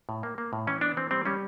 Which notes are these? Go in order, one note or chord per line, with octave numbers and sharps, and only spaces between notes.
A2
A#3
A#3
A2
E3 C#4
B3 D4
E3 C4
G3 C4
G3 C#4